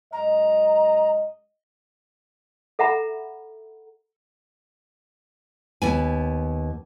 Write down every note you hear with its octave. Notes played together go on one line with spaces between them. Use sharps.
F#2 G#3 D#5 A#5
A4 E5 F#5 A#5 B5
D#2 B3 G#5